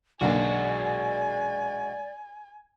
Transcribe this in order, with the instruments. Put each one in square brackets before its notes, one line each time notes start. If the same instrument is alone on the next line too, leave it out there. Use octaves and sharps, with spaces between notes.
[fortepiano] B1 D3 A#3 [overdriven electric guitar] G#3 F#4 [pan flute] D5 [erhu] G#5